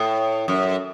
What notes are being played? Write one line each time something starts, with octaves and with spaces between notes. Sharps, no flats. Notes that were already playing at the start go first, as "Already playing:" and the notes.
Already playing: A2
F#2